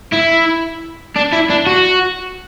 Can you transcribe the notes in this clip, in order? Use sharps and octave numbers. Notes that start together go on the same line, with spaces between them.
E4
D4
E4
D4
F#4